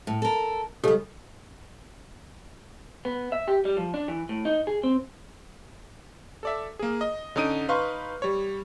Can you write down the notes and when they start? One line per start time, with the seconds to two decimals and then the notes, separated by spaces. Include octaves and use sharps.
0.07 A2
0.22 A4 A#4
0.84 C#3 G3 G4 A4 D#5
3.05 B3
3.32 E5
3.48 G4
3.65 G3
3.77 F3
3.94 D4
4.08 E3
4.29 A2
4.45 D#4
4.67 G#4
4.83 C4
6.43 A4 D5 E5
6.79 A#3 G#4
7.01 D#5
7.36 D3 C#4 D#4 D#6 D7 D#7
7.68 D#4 B4 F5 C6 C#6
8.22 G3 C#5